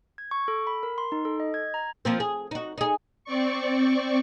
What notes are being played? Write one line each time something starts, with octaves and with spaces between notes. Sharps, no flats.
G#6
C#6
A4
B5
A#4
C6
D#4
A4
D#5
G#6
A#5
F3 A#3 C4
G#4
D#4 F#4
D#4 G#4
C4 D5 C#6